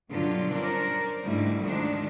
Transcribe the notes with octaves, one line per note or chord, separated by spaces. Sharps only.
G2 B2 D3 F#3 D4 F4
C#4 D4 A#4 C5 D5
G#2 D3 G3 A3 E4
D2 D3 D#3 F3 G#3 D4